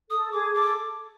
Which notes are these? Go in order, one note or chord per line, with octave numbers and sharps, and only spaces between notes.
A4 D#6
G#4 D6
A4 D6